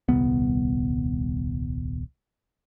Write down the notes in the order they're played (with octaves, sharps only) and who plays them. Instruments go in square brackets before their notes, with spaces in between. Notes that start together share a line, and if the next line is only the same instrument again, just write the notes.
[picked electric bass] D#1 C2 B3